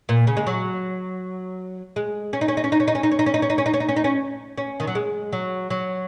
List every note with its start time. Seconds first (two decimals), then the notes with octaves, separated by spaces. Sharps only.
0.09 A#2
0.27 C#3
0.37 G#3
0.47 F#3
1.96 G#3
2.33 C#4
2.41 D#4
2.48 C#4
2.57 D#4
2.64 C#4
2.72 D#4
2.80 C#4
2.88 D#4
2.95 C#4
3.03 D#4
3.11 C#4
3.19 D#4
3.26 C#4
3.34 D#4
3.42 C#4
3.50 D#4
3.58 C#4
3.66 D#4
3.74 C#4
3.80 D#4
3.89 C#4
3.96 D#4
4.04 C#4
4.58 C#4
4.80 D#3
4.87 F#3
4.95 G#3
5.32 F#3
5.70 F#3